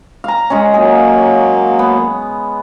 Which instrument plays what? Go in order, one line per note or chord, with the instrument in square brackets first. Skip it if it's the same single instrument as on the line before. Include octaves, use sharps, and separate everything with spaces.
[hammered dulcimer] F5 A#5
G#3 C#4
[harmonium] F#3 A#3 [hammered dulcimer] G#4
[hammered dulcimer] B3